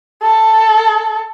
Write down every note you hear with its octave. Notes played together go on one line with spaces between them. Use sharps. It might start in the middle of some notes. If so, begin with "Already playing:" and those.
A4